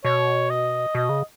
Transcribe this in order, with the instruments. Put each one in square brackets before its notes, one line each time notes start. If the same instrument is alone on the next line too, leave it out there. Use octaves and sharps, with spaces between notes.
[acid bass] B2 [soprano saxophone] C#5
[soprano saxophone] D#5
[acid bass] B2 [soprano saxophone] D#5
[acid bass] C#3